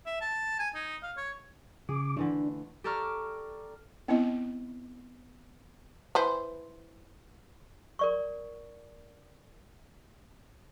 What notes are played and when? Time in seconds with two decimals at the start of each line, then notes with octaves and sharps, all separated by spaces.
0.06 E5
0.21 A5
0.59 G#5
0.75 D#4
1.03 F5
1.17 C#5
1.89 C#3 G#4 D6
2.17 D3 E3 A3 D4
2.84 G4 A4 D5 A#5 C#6 F6
4.08 B3 C4 E4 D#5
6.15 E3 B4 C5
7.99 A#4 D5 C#6